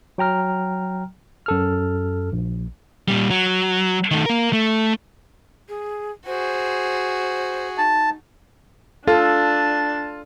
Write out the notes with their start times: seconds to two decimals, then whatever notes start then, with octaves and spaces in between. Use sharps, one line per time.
0.18 F#3 G5 A#5 F6
1.46 F#2 A4 F6
2.32 A#1
3.08 A#2 G3
3.30 F#3
4.11 D#3 A3
4.26 A#3 A#4
4.53 A3
5.69 G#4
6.26 F#4 G#4 C5
7.78 D#4 A5
9.08 D4 F4 A4 A5